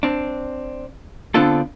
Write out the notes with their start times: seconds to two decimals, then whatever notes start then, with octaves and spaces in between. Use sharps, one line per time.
0.03 C4 D4
1.34 D3 B3 C4 D4 F4 A4